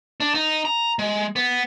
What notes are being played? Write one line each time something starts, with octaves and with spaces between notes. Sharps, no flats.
D4
D#4
A#5
G#3
B3